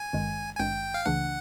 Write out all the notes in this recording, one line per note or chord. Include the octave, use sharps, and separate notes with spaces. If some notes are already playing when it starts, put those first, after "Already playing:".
Already playing: G#5
G#1 G2 D#3 G#3
G#5
G#1 G2 D#3 G#3 G5
F5
C#2 C#3 E3 A3 D4 F#5